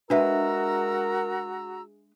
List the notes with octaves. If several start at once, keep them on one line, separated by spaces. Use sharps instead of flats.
G#3 D4 F#4 A#4 B4 E5 A#5 E6